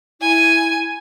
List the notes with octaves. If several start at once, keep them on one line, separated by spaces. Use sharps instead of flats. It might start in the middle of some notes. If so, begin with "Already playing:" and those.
E4 G#5